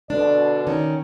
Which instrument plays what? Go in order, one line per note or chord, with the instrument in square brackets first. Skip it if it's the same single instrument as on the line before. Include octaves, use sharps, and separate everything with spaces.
[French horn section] B2 D3 D5 [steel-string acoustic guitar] D4
[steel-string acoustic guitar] D#3 C#4